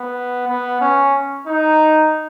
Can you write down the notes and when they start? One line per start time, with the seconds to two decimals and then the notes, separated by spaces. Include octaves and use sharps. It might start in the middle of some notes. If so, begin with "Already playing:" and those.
Already playing: B3
0.48 B3
0.81 C#4
1.47 D#4